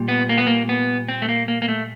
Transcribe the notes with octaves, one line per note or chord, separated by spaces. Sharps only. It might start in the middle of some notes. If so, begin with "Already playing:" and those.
Already playing: A#2 G3
B3
A#3
B3
A#3
B3
C4
A3
A#3
A#3
A#3
A3